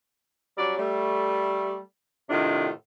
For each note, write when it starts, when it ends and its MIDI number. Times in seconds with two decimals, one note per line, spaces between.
0.58 0.75 54
0.58 0.75 55
0.58 0.75 61
0.58 0.75 74
0.77 1.77 55
0.77 1.77 57
2.30 2.68 45
2.30 2.68 48
2.30 2.68 51
2.30 2.68 62
2.30 2.68 65